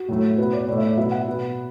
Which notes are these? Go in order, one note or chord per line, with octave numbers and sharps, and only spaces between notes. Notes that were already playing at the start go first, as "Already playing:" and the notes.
Already playing: F#4
A2 F#3 A3
B2 B3 B4
D5
A2 A3 D5
E5
D5
B2 F#3 B3 E5
F#5
B2 B3